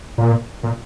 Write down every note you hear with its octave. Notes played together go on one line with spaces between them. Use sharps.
A#2
A#2